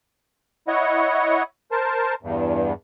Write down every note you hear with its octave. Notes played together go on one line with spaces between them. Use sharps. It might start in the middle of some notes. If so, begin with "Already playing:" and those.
E4 C#5 D#5 F#5 C#6
A#4 C5 A5
E2 G2